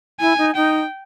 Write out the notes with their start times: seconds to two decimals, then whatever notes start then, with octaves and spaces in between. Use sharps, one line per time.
0.20 E4 G#5
0.38 D#4
0.56 D#4 G5